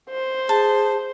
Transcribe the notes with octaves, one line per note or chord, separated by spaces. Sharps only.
C5
G#4 A5